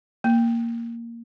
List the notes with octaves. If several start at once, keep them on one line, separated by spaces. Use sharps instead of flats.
A#3